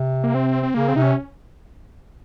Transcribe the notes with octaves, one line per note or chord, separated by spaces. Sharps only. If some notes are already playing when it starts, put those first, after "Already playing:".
Already playing: C3
A#3
C4
C4
C#3 A#3
C4
C3 D#4
C#4